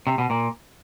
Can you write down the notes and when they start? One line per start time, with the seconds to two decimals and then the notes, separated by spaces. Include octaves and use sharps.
0.07 C3
0.18 B2
0.30 A#2